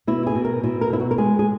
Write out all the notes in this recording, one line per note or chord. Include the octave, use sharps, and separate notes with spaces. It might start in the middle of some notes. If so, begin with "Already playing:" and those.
B2 E4
G#4
B2
A#4
B2 E4
A#4
B2 E4
F#4
A#4
G#3 G#4
G#4